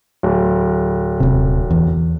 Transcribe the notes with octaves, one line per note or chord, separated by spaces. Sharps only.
D1
D#1 C3
E2